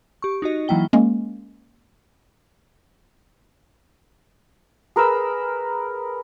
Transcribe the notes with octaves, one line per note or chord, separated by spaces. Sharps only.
G4 C#6
D#4 F#4 D#5
E3 F#3 A#3 E4 G5 G7
G#3 A#3 C#4
G#4 A#4 B4 E6